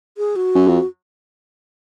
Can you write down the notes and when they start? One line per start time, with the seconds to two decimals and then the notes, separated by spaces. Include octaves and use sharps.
0.18 G#4
0.36 F#4
0.55 F#2
0.67 F2